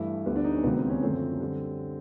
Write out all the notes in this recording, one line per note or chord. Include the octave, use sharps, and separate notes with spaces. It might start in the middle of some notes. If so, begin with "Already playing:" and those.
Already playing: G2 E3 A3 E4
D2 D3 G3 B3
D4
D#4
C#4
C#2 C3 D#3 F#3 A#3 B3
C4
C#4
F#2 D3 F3 A3 C4
D3 G3